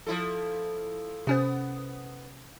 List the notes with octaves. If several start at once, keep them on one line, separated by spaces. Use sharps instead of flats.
F3 E4 A4
C3 B3 C#4 C5